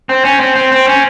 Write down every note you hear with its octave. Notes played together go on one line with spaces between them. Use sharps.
C4
C#4
C4
C4
C4
C#4